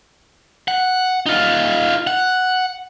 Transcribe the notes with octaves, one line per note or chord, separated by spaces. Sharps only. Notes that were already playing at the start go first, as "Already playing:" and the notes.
F#5
D#4 F4
F#5